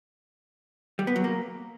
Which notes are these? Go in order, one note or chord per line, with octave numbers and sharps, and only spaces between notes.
G3
B3
F#3
A#3